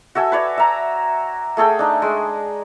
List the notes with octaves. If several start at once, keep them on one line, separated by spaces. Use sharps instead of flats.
F#4 A4 E5 G#5
B4 C#5 D5
E5 A#5
A3 G#4 A4 G5
D4 D#4
G#3